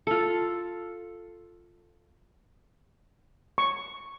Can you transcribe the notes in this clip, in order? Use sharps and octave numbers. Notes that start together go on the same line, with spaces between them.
F4 A4
C#6